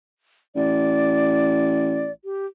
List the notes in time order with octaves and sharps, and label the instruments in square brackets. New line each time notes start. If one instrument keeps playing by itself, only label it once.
[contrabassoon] A1 [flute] D5
[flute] G4